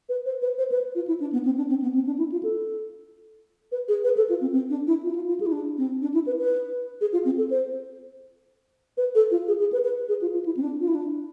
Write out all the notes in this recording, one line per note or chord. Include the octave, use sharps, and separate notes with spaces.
B4
C5
B4
C5
B4
F4
E4
D4
B3
C4
D4
C4
B3
C4
D4
E4
F4
A4
B4
G#4
B4
A4
F4
C4
C4
D4
E4
F4
E4
F4
F4
G#4
E4
D4
C4
D4
E4
B4
B4
G#4
F4
C4
A4
C5
B4
A4
F4
G#4
G#4
B4
B4
G#4
F4
F4
E4
C4
D4
F4
E4
D4